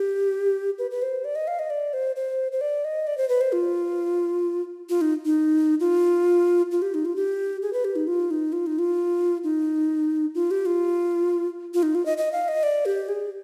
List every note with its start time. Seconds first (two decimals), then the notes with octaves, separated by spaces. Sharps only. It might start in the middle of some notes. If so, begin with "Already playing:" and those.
Already playing: G4
0.79 B4
0.91 B4
1.02 C5
1.25 D5
1.35 D#5
1.47 F5
1.59 D#5
1.70 D5
1.93 C5
2.16 C5
2.52 C5
2.61 D5
2.85 D#5
3.07 D5
3.18 C5
3.29 B4
3.41 C5
3.52 F4
4.90 F4
5.01 D#4
5.26 D#4
5.80 F4
6.72 F4
6.82 G4
6.94 D#4
7.05 F4
7.16 G4
7.62 G#4
7.73 B4
7.85 G4
7.96 D#4
8.08 F4
8.31 D#4
8.53 F4
8.67 D#4
8.79 F4
9.44 D#4
10.35 F4
10.51 G4
10.66 F4
11.74 F4
11.83 D#4
11.95 F4
12.06 D#5
12.18 D#5
12.32 F5
12.48 D#5
12.63 D5
12.86 G4
13.08 G#4